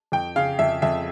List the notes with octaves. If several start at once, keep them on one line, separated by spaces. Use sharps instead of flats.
F2 G5
C#3 F5
F2 E5
F2 E5